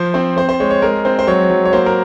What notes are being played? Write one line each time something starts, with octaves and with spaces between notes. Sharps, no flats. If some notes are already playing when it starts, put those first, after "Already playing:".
Already playing: F3 C5
C4 C5
C4 C5
C5
G#3 C#5
C#5
G#3 A#4
C4 C5
C5
F#3 C#5
F#3
C#5
A#3 C5
A#4